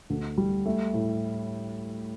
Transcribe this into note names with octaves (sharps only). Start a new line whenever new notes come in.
D2
G3
A3
A2